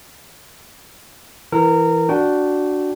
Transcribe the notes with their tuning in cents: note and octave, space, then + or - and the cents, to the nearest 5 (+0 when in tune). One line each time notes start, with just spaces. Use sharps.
E3 +0 A#4 -20
D4 +0 F#4 +0 G5 -20